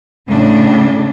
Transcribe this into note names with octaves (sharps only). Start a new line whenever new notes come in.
A2 C#3 D4